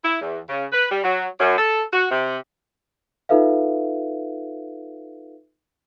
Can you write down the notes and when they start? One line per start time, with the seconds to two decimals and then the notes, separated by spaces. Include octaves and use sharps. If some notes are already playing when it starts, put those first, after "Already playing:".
0.04 E4
0.22 E2
0.49 C#3
0.73 B4
0.91 G3
1.04 F#3
1.40 F#2
1.58 A4
1.93 F#4
2.11 C3
3.29 D#4 F4 A4 B4 E5 F5